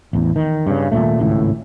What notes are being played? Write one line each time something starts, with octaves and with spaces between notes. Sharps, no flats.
A1 E2
D#3
G2 C#3
D#1 G#1 A#2 A3
G#1 C#2 A2